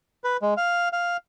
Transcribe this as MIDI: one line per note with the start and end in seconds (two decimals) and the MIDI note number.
0.24 0.37 71
0.42 0.54 56
0.57 0.89 77
0.93 1.17 77